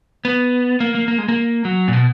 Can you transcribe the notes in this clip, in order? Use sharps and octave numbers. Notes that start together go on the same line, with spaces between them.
B3
A#3
A#3
A#3
G#3
A#3
F#3
A#2
B2